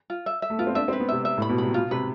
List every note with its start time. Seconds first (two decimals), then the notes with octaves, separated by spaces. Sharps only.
0.10 F4
0.26 E5
0.42 E5
0.50 A3
0.58 B3 F4
0.67 C4
0.75 D4 E5
0.88 C4
0.93 B4
1.00 B3
1.08 C3 E5
1.25 E5
1.37 A2
1.42 B5
1.49 B2
1.58 C3 B5
1.74 B2 F4
1.91 C3 B4